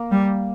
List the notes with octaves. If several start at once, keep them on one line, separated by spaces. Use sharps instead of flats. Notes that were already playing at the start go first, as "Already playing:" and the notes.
Already playing: A#3
G3